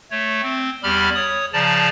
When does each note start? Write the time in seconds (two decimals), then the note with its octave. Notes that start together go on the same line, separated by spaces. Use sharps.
0.11 A3 C#5
0.42 C4
0.83 E2 G3 G4 B5 F6
1.15 C#5 D#6
1.53 C#3 F3 D5 A5 A#5